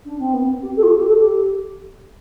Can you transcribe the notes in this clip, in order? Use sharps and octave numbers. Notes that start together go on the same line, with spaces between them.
D4
C4
B3
C4
G4
A4
F4
G4
G4
A4
G4